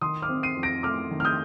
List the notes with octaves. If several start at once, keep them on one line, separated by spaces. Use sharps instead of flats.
D#3 C6 D#6
D6 F6
C4
C7 D#7
F2
A#6 D7
A3 D6 F6
D#3
F6
D#6 G6